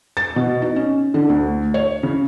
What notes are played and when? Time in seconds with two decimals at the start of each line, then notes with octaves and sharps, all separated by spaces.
0.17 A6
0.36 B2
0.62 D#4
0.76 C#4
1.14 D3
1.29 D2
1.74 C#5
2.03 C#3